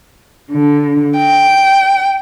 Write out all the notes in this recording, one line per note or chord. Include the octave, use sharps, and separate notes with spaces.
D3
G5